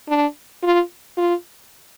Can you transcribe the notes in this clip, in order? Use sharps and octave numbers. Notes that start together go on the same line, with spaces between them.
D4
F4
F4